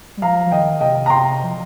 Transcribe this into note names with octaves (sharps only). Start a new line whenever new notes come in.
G3
F3 F5 A#5
F3
D#3 D#5 G5
C3 D#5 G5
A#5
C3 G5 C6
F3